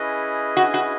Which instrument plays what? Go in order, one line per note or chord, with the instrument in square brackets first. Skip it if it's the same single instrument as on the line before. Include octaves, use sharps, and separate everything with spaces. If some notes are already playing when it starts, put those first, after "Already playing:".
Already playing: [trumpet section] C#4 E4 G#4 B4 D#5
[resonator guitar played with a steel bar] F#4
F#4